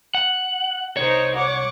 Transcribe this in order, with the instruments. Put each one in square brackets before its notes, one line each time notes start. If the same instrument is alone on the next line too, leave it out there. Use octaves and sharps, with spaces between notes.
[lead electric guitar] F#5
[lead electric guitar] C2 C#5 [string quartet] D#4 A#4 C5
[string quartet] F#5 C#6 D6